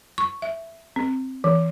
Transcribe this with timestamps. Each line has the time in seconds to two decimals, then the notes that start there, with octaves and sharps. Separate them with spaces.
0.18 C#6
0.42 E5
0.96 C4
1.44 E3